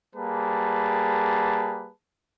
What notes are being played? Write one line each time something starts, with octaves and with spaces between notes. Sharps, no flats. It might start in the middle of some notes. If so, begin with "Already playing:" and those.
G3 A#3 G#4 B4 A5